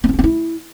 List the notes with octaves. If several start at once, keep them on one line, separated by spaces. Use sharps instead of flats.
B3
C4
C#4
C4
E4